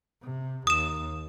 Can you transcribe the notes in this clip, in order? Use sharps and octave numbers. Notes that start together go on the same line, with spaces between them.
C3
D#2 D#6 E7